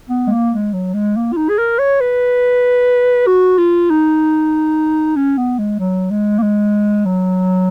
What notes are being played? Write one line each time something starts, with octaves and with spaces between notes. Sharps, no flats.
B3
G#3
A#3
G#3
F#3
G#3
A#3
F4
D#4
G#4
A#4
C#5
B4
F#4
F4
D#4
C#4
B3
G#3
F#3
G#3
A#3
G#3
F#3